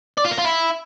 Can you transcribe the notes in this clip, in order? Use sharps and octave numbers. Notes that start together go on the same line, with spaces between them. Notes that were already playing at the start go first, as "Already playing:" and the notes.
D5
F4
A#4
F4
E4